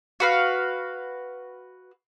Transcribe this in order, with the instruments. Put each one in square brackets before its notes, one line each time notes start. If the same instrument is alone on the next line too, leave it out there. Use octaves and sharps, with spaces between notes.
[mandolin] F#4 B4 F5